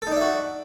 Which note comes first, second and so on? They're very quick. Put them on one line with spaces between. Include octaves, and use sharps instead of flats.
A4 D#4 D4 E5 F#4